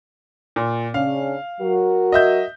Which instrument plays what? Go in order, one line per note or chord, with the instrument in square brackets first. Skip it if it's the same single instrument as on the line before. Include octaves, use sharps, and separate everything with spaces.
[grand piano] A#2
[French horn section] C#3 C#4 D4 [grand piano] F5
[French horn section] F#3 F#4 A#4
[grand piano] D#5 E5 G6